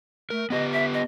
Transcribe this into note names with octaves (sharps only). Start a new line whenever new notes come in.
A3 A#4
B3 G4 B4 D#5
E5
D#5